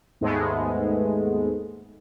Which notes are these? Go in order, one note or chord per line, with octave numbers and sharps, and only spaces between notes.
D#2 G#2 G#3 A3 B3